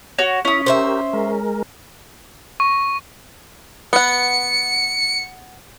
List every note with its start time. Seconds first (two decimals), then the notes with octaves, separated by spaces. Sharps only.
0.18 F#4 C#5
0.45 C#4 E4 D#6
0.66 G4 A#4 C5 C#5 E5
1.13 G#3 A#4
2.60 C#6
3.93 B3 F#5 C#7